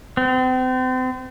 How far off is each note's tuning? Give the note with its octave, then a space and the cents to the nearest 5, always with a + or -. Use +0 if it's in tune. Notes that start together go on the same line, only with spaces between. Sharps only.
C4 -35